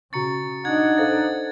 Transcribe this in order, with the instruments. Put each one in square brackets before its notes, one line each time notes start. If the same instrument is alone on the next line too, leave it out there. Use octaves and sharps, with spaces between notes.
[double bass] C#3 [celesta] F#4 A#5 C#6 [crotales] A6 C#7
[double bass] D4 D#4 [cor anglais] F#5 [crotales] G#6
[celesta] A4 C5 F5 [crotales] A6